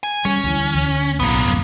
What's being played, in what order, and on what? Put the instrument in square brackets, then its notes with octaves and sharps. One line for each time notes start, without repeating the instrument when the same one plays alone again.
[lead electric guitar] G#5
[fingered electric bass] G3 [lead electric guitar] C#4
[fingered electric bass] D2 E3
D2
[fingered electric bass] B1 A2 [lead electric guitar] A#3 B3
[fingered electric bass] D1 C2 F#2